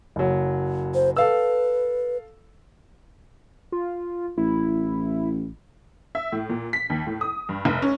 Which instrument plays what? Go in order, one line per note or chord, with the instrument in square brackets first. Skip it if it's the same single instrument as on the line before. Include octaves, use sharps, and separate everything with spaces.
[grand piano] F#1 F#3
[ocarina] C5
[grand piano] A4 F5 E6 [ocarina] B4
[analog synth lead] F4
[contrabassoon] A1 [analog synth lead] E4
[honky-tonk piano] E5
A2
A#2
B6
D#2
A2
D#6
G2
F1
C#4